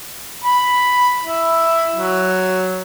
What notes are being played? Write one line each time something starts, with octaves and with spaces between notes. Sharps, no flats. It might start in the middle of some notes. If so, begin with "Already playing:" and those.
B5
E4
F#3